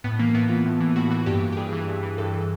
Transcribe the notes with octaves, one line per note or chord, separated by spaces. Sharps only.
A2 B3
E3 A#3
A2 B3
E3 F4
A2
E3
A2 F#4
E3 F#4
G2 G4
E3
G4
G2 G#4
E3
G2
E3
G2 A4
E3